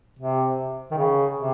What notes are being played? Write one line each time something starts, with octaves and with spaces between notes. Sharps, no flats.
C3
D#3
C#3
C3